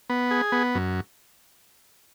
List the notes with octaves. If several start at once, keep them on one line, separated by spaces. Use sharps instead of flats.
B3
G#4
B3
F#2